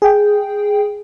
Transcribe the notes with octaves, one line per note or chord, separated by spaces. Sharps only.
G#4 G5